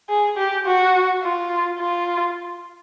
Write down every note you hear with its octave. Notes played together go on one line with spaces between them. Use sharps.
G#4
G4
F#4
F4
F4